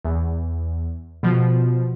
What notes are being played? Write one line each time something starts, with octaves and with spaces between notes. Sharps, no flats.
E2
B2 F3